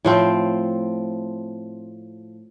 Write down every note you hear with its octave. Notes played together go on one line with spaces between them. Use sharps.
A2 F3 C4